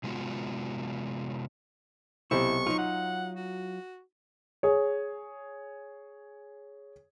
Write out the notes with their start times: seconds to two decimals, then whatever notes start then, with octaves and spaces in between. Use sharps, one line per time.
0.04 C3 G#3 A3 B3 F4 F#4
2.31 B1 C3 E4 C5 C#6
2.67 F#3 D#4 F4
2.79 F#5
3.35 F#4
4.63 G#4 C#5